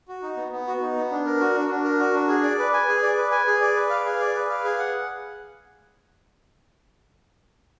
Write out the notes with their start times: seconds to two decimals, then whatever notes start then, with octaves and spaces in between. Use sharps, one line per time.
0.08 F#4
0.23 D#4
0.37 B3
0.52 B3
0.67 F#4
0.81 D#4
0.96 B3
1.11 D4
1.25 A#4
1.40 F#4
1.55 D4
1.69 D4
1.84 A#4
1.99 F#4
2.14 D4
2.28 G#4
2.43 D5
2.59 B4
2.73 G#5
2.88 G#4
3.03 D5
3.17 B4
3.31 G#5
3.47 G#4
3.61 D5
3.76 B4
3.90 F5
4.05 G#4
4.20 D5
4.35 B4
4.49 F5
4.64 G#4
4.79 F#5